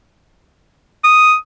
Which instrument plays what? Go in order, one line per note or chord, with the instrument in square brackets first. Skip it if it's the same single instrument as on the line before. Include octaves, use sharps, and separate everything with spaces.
[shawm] D#6